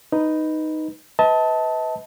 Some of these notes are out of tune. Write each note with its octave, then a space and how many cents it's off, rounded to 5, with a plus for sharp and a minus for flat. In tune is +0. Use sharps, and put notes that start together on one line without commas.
D#4 +0 B4 +0
B4 +15 D#5 +45 A5 +0